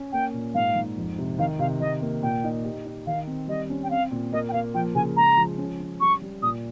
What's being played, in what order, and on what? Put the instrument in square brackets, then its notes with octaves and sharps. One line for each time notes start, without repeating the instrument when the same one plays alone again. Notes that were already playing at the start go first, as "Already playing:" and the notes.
Already playing: [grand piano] C#4
[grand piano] A#3 [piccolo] G5
[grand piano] A#2
[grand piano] G#2 [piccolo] F5
[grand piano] G#2
F2
C3
[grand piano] D#3 [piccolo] F5
[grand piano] C3 [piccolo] F5
[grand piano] D#3 [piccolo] D#5
[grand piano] A#3
[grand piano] A#2 [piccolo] G5
[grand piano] D#4
G4
D#4
[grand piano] D#3 [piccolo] F5
[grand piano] C4
[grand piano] G3 [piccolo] D#5
[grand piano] C#4
[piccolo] G5
[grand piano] C4 [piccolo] F5
[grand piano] A#2
[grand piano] A#3 [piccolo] D#5
[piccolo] G5
[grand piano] A#3 [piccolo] F5
[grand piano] F3 [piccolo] G5
[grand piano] C#3 [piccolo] G#5
[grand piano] G#3 [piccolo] A#5
[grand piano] F3
C#4
C#4
[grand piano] G3 [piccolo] C#6
[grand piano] G3
[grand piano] A#2 [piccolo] D#6